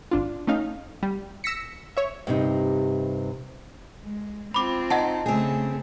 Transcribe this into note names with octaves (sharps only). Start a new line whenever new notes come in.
G#1 D4 F4
A3 C#4 D#4 F5
G3
E6 A#6 B6 C#7
C#5 E5
G2 C3 D#4
G#3
C4 F4 B5 D6
D#4 D#5 F#5 A5
C#3 A3 C4 G#4